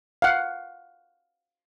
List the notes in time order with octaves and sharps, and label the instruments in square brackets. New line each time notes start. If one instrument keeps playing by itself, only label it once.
[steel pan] F5 F#5